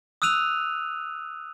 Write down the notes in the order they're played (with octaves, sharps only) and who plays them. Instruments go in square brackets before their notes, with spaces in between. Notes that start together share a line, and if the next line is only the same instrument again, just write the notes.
[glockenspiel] D#6 E6 F#6 D#7 F7